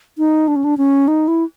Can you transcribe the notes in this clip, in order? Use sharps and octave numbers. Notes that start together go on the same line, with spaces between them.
D#4
D4
C#4
D4
C#4
D#4
E4